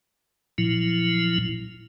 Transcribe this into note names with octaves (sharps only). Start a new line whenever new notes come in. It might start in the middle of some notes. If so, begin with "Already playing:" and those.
A#2 F3 F#3 E4